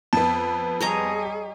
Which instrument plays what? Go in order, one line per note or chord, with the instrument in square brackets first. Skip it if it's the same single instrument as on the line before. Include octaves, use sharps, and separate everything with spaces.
[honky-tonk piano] F2 B3 [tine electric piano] A5
[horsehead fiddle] G3 G#4 [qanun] C#5 D#5 A#5